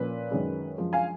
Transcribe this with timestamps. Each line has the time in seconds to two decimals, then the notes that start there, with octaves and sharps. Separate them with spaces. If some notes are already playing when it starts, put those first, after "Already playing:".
Already playing: A#2 F3 A#3 C#4 B4
0.31 F#2 D#3 G#3 C#4
0.78 F#2 F3 G#3
0.93 F5 G#5